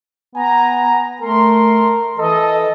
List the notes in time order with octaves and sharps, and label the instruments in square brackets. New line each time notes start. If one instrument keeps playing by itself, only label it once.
[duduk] B3 [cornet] G#5 [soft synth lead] A#5
[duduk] A3 [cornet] A#4 [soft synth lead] C6
[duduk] E3 [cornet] A4 [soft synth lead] D#5